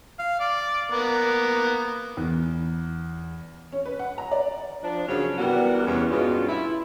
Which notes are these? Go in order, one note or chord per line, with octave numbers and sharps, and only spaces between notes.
F5
D5
A#3 B3
E2
C#4
B4
F#5
A#5
D5
F3 D4
F#2 C#3 F#3 C#4
C3 E3 G3 B3 F#4 A#4
E2 C#4
G2 B2 G#3 C#4 F4
E4